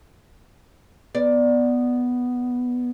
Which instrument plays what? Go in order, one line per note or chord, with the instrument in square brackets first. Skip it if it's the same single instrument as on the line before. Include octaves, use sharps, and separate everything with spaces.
[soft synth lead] B3 [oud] D5